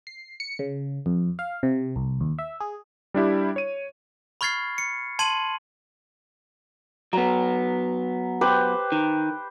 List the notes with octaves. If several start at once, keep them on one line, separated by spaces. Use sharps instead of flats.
C7
C#7
C#3
F2
F5
C3
C2
D#2
E5
G#4
G3 D4 E4 G4
C#5 D#7
B5 C#6 F6 G#6 A6 C7
C#7
A5 C6 G#6 D#7 F#7
F#3 B3 A#5
G4 B4 C5
D#3